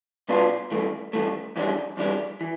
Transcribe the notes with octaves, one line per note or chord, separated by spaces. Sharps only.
C2 B2 B3 D4 F4
G2 E3 A3
G2 E3 A3
F2 E3 G3 D4
F2 E3 G3 D4
E3